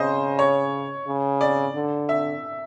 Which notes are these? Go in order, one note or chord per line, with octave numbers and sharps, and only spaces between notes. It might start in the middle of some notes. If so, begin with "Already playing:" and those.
Already playing: C#3 C5 D#5
C#5
C#3
D5
D3
E5